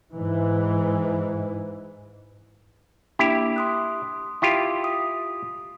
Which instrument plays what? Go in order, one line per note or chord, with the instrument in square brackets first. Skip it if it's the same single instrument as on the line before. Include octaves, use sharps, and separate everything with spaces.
[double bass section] G#2 E3
[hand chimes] A#3 D4 [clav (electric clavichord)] E4 G4
[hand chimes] C6 D#6 F#6
[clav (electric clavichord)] E4 F4 G4
[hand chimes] D#6 B6